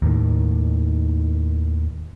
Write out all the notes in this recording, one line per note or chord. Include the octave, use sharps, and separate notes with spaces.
D#2 A2 D#3